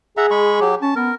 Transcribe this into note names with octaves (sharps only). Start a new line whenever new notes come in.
G#4 E5 F#5 A#5
G#3 B5 C#6
F#3 G4
C#4 A5
B3 A#4